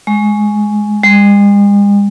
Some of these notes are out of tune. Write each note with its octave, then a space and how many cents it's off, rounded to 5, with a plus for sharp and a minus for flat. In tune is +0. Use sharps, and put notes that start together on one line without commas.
G#3 +10
G#3 -45